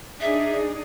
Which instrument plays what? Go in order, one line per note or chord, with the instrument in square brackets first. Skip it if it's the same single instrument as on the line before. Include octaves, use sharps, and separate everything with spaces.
[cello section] D4 D#4 G#4 [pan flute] E5